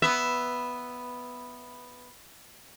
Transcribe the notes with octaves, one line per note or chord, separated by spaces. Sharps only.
B3 E5